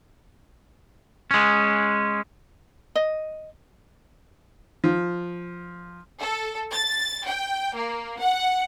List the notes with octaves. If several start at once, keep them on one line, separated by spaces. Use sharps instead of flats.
G#3 C#4
D#5
F3
A4
A6
G5
A#3
F#5